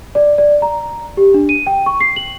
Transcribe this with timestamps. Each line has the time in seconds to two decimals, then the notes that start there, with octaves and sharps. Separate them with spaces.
0.15 D5
0.38 D5
0.62 A#5
1.17 G4
1.34 D4
1.49 D#7
1.67 G5
1.86 C#6
2.01 C7
2.16 F#7